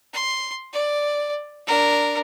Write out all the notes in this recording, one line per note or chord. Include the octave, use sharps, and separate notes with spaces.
C6
D5
D4 A#4